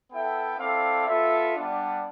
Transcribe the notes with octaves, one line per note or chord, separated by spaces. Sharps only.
B3 E4 A4 E5 G5
C4 E4 A4 D5 F5
B3 F4 A4 E5
G3 B3 D4